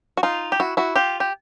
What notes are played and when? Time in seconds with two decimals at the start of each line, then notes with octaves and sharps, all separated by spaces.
0.17 F#4
0.23 D#4 F4
0.52 G4
0.60 E4 F#4
0.77 E4 F#4
0.96 F4 G4
1.20 G4